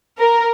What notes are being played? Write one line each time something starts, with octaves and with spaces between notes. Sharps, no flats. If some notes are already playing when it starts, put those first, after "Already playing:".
A#4